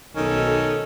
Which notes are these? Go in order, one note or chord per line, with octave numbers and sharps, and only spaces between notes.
B1 D#3 C#4 A4